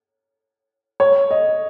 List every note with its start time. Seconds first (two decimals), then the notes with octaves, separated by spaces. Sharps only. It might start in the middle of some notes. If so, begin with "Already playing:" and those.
1.00 C#5
1.31 D#5